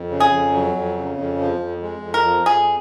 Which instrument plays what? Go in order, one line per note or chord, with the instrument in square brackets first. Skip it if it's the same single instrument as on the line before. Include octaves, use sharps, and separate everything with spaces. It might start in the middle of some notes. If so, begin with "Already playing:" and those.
Already playing: [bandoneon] F2
C#3
[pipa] G#4
[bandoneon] F2
F#3
F2
C#3
F2
F3
F2
G#3
F2
[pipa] A#4
[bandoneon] F3
[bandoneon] F2 [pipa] G#4